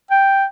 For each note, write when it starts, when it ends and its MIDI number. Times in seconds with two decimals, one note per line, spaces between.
0.11 0.45 79